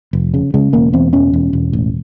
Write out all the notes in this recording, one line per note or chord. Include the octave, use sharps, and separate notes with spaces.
F1
C#3
C#3 G#3
E1 A#3
E2 C4
E1 C#4
E1
E1
A1